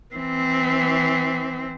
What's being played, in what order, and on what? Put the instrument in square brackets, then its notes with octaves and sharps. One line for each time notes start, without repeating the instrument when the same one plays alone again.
[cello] E3 C4